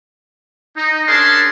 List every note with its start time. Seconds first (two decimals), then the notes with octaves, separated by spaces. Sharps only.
0.77 D#4
1.07 C#4 D4 G#4 A#4 A5 C6